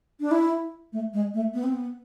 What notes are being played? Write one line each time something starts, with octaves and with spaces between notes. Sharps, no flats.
D4
E4
A3
G#3
A3
B3
C4
B3